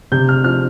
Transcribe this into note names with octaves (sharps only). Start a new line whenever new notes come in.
C3 G6
F6
F3 F6